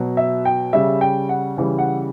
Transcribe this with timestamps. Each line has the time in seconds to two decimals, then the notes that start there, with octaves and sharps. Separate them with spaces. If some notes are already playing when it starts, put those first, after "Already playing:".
Already playing: B2 F#3
0.17 E5
0.45 G5
0.73 C#3 G3 E5
1.01 G5
1.29 F#5
1.57 C#3 E3 G3
1.78 F#5